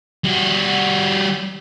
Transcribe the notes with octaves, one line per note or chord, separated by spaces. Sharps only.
G3 F#4